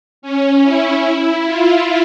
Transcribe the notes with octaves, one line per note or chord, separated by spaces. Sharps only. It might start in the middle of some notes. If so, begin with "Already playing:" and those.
C#4
E4
F4